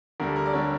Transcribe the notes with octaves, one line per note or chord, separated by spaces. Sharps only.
D2 D3 G3 A#4
A4
A#4
D5
D3 G3 C#5